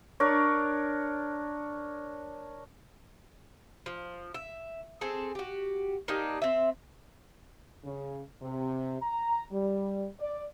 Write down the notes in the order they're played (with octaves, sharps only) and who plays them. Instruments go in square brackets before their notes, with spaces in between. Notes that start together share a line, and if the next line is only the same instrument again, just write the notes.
[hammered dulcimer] D4 A#4 C#5
[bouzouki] F3
E5
C4 G#4 A4
F#4 G4
A#3 D4 D#4 G4
C4 E5
[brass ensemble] C#3
C3
A#5
G3
D5